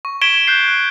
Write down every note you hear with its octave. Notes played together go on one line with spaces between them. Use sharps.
C#6
C#6 G#6 B6 D7 E7 G7
F#6 G6 C7
F#6